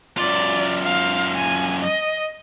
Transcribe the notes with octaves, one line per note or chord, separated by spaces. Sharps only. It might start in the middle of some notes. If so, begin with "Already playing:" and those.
F#2 F4 D5
F5
G#5
D#5